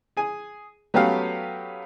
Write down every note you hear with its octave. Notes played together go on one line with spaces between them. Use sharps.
G#4 G#5
F#3 A3 B3 C#4 G4 F5